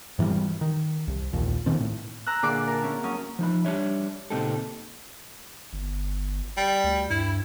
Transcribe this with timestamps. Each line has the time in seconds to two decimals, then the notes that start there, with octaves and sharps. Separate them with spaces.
0.19 G#2 E3 F#3 G3
0.61 D#3
1.08 C2
1.33 A#1 D#2 A#2
1.66 B2 D#3 C4
1.80 A2
2.27 A#5 E6 F#6
2.43 A#2 D3 E4 G#4 D5 D6
2.67 A#4 A5
2.82 A#3 C#4 E4
3.04 F#3 C#4 D#6
3.39 F3 D#4 B5
3.65 G3 D4 C#5 E5
4.30 C#2 A#2 C4 D#4 G4 A4
5.73 G1
6.57 G3
6.84 D2
7.10 G2 E4